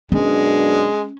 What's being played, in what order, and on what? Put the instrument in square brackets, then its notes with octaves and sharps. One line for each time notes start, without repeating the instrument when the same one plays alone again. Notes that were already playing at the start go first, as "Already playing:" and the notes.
[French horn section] F#2 B2 D4 [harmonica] G#3 [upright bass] C#4